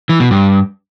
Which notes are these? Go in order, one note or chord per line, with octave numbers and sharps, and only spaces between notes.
E3
B2
G2